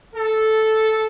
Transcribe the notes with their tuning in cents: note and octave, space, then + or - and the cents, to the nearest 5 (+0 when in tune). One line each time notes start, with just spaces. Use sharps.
A4 -5